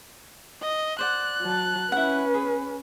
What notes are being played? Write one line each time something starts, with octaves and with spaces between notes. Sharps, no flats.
D#5
C5 D5 F#5 F#6
F#3 A5
C#4 E4 B4 F#5
G#4